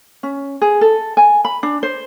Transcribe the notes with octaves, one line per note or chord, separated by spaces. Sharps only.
C#4
G#4
A4
G#5
B5
D4
C5